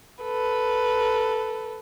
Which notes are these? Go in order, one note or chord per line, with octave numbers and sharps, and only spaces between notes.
A4 B4